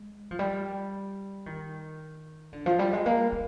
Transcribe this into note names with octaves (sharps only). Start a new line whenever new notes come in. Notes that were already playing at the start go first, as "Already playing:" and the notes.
Already playing: G#3
F3
G3
D#3
D3
F3
G3
G#3
A#3
A#3